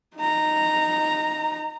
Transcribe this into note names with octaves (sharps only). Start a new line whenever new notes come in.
D#4 A#5